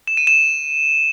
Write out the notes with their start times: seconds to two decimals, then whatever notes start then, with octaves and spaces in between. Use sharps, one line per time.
0.07 E7
0.17 D#7
0.27 E7